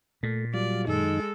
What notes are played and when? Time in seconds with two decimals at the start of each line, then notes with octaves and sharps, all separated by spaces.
0.23 A#2 A3
0.54 F#3 G3 F4 D5
0.87 F#2 D#3 G#3 D#4 A4